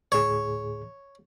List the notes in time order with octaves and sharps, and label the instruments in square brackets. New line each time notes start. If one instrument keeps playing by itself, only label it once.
[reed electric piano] D2 A2 G#4 [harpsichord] C#5